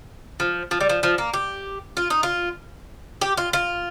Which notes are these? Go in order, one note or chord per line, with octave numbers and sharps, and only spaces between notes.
F3
F3
G3
F3
F3
A#3
G4
F4
D#4
F4
G4
F4
F4